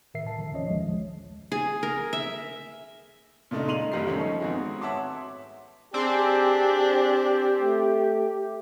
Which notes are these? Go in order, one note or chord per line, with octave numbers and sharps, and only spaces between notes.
A2 D#3 A#4 E5 C7
A5
D3 F3
D#2 D#3 F3 C#4 C#5 D#5
A#1 D#2 F3 G#3
G#4
A#4
E5
A#2 C#3 A3 D4 D#4
G#3 D#4 C6 D#7 F7 F#7
F#1 D2 G2 G3 A#4 C7
F3 A3 C#4 D#4
G#2 B3 C4 F#4 G#4
C#5 E5 F#5 A5 C6 D6
C4 D4 G4 G#4
A3